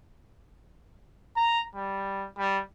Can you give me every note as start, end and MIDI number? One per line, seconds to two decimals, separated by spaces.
1.37 1.62 82
1.76 2.26 55
2.38 2.60 55